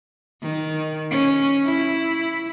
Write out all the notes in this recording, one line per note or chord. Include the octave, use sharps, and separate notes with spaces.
D#3
C#4
E4